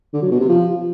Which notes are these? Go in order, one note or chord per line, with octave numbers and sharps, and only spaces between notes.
D3
F#3
B2
C3
F3